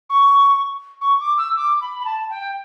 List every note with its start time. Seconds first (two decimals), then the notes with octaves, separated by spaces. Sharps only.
0.09 C#6
1.01 C#6
1.20 D6
1.38 E6
1.56 D6
1.81 B5
2.00 B5
2.05 A5
2.29 G5